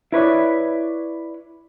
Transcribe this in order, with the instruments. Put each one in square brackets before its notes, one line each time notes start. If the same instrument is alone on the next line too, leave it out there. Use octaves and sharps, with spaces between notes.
[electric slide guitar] E4 B4 C#5 D5